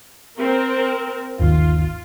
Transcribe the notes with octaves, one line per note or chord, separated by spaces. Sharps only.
C4 A#4
G1 D#2 D#3 F4